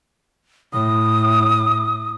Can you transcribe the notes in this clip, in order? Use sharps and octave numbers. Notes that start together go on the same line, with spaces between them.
A2 D#6